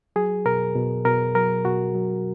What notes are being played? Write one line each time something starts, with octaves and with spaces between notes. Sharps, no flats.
F#3 G#4
B2 A#4
B2
B2 A#4
F#3 A#4
B2 F#4
F#3